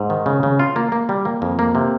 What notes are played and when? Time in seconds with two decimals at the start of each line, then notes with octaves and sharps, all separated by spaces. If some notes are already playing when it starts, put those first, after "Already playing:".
Already playing: G#2
0.10 D#3
0.26 C#3
0.43 C#3
0.60 F4
0.76 A#3
0.92 A#3
1.09 G3
1.25 A#3
1.42 F2
1.59 A#3
1.75 C3